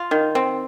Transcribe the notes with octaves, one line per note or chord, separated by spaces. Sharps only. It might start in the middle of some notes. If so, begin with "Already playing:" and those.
Already playing: F4
D#3
C4